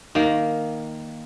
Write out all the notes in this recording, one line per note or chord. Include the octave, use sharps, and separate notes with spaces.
D#3 A#3